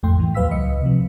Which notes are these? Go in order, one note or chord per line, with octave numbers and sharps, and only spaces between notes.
A#1 F2 A2 A3 G5 C6
A2 E3
D#2 F#3 B4 F5 E6 B6
C#2 D#5 C#7
C3 F3